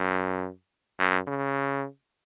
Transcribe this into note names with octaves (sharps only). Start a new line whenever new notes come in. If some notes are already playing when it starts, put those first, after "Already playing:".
Already playing: F#2
F#2
C#3